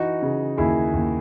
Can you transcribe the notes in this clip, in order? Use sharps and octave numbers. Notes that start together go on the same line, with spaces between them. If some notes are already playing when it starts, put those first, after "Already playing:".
Already playing: E3 D#4 F#4
C#3
D#2 E4 G#4
D#2